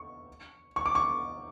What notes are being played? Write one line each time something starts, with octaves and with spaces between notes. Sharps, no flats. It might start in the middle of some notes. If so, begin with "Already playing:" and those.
Already playing: C#6
C#6
D6
C#6